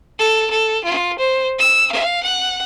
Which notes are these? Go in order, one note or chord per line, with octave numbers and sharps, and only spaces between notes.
A4
A4
F4
C5
E6
F5
F#5